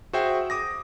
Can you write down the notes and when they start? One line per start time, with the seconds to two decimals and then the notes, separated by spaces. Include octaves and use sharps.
0.13 F#4 G#4 C5 E5 G5
0.50 D6 D#6 A#6